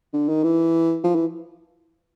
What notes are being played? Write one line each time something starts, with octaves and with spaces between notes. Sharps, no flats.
D3
D#3
E3
F3
E3